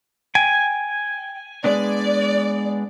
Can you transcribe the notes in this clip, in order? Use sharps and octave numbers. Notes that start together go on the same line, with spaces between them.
G5 G#5
G#3 B3 D4 D5